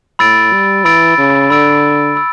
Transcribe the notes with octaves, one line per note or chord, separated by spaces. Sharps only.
A2 B5 E6 A6 D7
G3
E3 B5 E6 A6 D7
C#3
D3 B5 E6 A6 D7
B5 E6